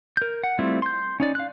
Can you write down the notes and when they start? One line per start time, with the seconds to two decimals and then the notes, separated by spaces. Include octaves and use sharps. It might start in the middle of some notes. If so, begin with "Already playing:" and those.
0.17 A#4 G6
0.43 F#5
0.59 G3 A3 C4 E4 F4
0.82 C6 G6
1.20 C#4 D#4 D5
1.35 F5 F#6